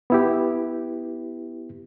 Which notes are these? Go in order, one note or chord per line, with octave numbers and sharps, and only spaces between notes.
B3 E4 G4